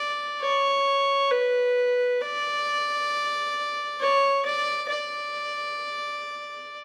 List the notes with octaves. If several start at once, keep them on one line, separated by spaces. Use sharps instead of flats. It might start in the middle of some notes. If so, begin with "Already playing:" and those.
Already playing: D5
C#5
B4
D5
C#5
D5
D5